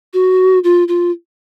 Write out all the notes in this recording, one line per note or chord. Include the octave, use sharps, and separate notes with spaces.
F#4
F4
F4